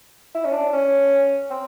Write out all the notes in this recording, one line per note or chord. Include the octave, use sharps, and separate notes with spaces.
E4
C#4
D4
C#4
C4